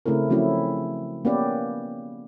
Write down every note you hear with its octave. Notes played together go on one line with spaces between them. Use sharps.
C#3 A3 C4 E4 A#4
F3 F#3 A3 C4 C#4 E4
A#3 B3 C#4 G4 B4 D5